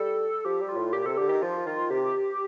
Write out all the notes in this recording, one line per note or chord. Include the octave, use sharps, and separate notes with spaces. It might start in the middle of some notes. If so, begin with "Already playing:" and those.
Already playing: G3 A4
F3 G4
G3
F4
A2
A#2 G4
C3 A4
D3 G4
D#3 G4
F3 F4
D#3 F4
C3 G4